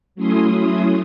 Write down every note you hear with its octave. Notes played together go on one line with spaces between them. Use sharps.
F#3 A3 C#4 E4 C6 D#6